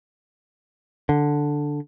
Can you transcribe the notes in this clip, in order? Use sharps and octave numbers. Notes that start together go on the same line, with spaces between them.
D3